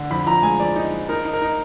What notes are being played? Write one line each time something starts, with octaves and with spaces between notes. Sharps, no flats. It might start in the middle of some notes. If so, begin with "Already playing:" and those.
Already playing: D3
F2 B5
F3 A#5
G#3 G#5
F3 D5
D#4
F3
D#4 A#4
D#4
A#4
D#4